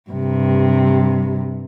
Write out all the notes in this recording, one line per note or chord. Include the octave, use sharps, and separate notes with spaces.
G2 C3